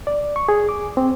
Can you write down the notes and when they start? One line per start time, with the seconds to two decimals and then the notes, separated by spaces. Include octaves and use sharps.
0.07 D5
0.36 C#6
0.49 G#4
0.69 D6
0.97 C4